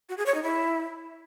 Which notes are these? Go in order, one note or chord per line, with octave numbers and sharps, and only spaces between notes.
F#4
G#4
C#5
D#4
E4